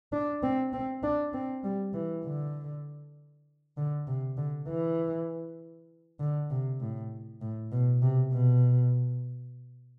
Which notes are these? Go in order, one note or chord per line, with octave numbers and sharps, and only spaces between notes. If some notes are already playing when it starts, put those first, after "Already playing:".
D4
C4
C4
D4
C4
G3
E3
D3
D3
C3
D3
E3
D3
C3
A2
A2
B2
C3
B2